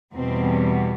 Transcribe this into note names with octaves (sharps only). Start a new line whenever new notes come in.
E2 B2 G3 C4